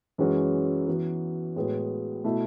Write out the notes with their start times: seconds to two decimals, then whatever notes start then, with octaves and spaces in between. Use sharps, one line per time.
0.18 F#2 E3 G#3 C#4 F#4
0.88 E3 B3 F#4
1.56 A2 G#3 B3 F#4
2.24 B2 A3 E4